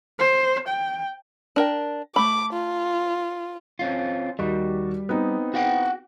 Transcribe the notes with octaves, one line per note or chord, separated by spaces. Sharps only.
C5
G5
D4 A#4 G5
A3 B5 D6
F4
C4 C#4 F4
D#2 G3 F#4 D#5
B3 C4 D#4
F#4 F#5 G5